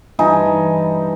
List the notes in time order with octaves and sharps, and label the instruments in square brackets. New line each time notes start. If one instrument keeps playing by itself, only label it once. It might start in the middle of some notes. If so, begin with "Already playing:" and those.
[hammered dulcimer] G2 E3 D#4 G#5